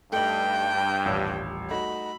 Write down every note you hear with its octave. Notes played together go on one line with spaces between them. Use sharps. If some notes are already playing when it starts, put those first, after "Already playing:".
G2 A3 D#4 G5 F#7
D#1 A1 E6
A3 D#4 F#4 B5